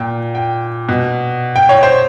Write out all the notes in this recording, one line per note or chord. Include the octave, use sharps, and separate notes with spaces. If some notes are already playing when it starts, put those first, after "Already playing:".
Already playing: A#2 G5
G5
B2
G5
C#5
C5